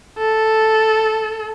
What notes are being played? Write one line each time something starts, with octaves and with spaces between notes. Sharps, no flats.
A4